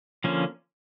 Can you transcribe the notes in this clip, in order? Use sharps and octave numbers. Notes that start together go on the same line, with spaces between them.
D3 F3 A#3 C#4